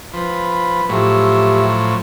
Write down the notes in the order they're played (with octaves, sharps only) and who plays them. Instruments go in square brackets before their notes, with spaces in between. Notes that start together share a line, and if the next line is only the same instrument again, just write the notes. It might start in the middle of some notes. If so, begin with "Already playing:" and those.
[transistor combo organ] F3 [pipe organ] B4 B5
[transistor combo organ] A2 F3 F#3 [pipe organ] G4 E5